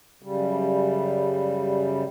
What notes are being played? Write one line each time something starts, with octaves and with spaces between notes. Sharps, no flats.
F#2 C#3 G3